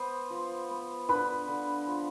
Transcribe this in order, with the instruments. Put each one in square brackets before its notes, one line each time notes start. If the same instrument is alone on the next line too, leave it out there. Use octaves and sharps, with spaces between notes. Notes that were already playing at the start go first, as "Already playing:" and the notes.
Already playing: [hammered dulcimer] B3 [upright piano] C5 C6
[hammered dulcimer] F3
B3
[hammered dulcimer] D3 [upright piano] B4 B5
[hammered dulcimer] D3
F3